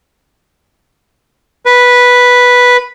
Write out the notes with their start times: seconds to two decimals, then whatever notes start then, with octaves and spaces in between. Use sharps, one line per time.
1.66 B4